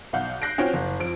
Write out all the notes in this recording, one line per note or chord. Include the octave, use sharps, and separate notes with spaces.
B1 F5 F#5 G6
F#6 G6 A#6 C7 D7
C4 C#4 F4 F#4 F#5 G5
F#1
F2 F3 D7